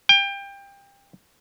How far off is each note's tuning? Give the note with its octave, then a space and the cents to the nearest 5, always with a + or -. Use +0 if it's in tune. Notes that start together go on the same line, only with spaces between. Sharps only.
G5 +25